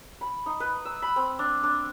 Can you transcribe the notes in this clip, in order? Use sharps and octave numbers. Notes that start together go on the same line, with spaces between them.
B5
D#4
B4
E6
B5
C4
D4
D4